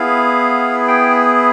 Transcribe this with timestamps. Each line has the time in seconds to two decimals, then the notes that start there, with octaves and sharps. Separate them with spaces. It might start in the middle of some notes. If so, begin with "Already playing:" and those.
Already playing: B3 E4 G#4 F5
0.88 G5